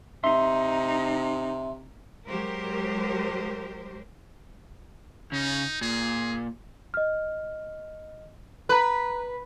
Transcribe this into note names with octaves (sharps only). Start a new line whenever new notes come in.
C3 D#4 E5 C6
F#3 G#3 G4 A#4 C5
C#3 D#4
A#2 G#4
D#5 F6
B4 A#5 F#6